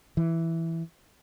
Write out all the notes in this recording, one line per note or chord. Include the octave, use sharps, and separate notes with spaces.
E3